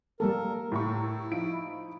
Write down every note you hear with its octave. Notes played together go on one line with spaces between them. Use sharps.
G3 A#3 A4 A#4
A2 E4 A#5 C#6
F3 D#4 D7